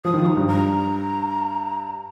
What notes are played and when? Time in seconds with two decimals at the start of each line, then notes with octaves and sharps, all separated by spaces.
0.05 F3 D#6
0.14 D#3
0.22 F3 A#5
0.37 G2
0.48 A#5